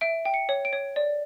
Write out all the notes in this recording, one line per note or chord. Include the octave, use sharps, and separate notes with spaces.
E5 D7
G5
C#7
C#5
D7
C#5
D5